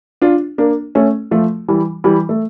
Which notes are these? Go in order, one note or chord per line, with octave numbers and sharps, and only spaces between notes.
D4 F4
A#3 D4
A3 C#4
F3 A3
E3 G3
E3 G3
A3